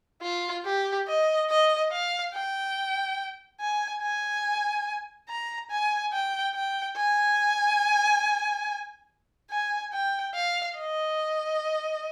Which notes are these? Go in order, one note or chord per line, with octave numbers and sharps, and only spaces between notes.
F4
G4
D#5
D#5
F5
G5
G#5
G#5
A#5
G#5
G5
G5
G#5
G#5
G5
F5
D#5